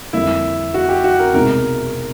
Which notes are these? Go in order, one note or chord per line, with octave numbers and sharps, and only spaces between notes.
F2 D3 G3 A#3 E4
F#4
G4
F#4
A#4
C2 B2 G#3 B3 D#4 A#4